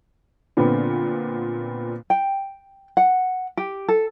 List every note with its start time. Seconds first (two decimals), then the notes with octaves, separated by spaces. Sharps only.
0.57 A#2 D3 B3 C4
2.10 G5
2.97 F#5
3.57 G4
3.88 A4